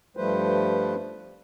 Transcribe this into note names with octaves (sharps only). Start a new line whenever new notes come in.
G2 F3 G3 A3 B4 C5